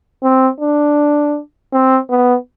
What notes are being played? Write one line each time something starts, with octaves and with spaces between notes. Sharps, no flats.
C4
D4
C4
B3